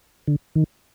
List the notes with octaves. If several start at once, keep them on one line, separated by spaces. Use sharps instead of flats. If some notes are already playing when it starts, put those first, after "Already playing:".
D3
D#3